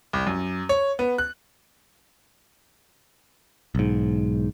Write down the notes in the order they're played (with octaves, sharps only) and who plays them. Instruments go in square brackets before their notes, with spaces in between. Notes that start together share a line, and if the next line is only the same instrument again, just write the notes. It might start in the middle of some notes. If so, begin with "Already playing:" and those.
[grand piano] C2
F#2
C#5
B3
F#6
[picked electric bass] B1 G#2